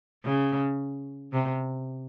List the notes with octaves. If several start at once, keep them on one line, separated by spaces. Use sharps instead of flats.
C#3
C3